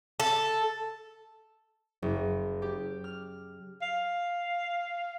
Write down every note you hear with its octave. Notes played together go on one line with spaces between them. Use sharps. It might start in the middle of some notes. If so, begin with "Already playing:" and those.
A4
F#1
G4
F6
F5